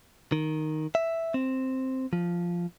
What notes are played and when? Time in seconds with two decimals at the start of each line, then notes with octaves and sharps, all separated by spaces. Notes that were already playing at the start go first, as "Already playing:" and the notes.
0.32 D#3
0.95 E5
1.34 C4
2.13 F3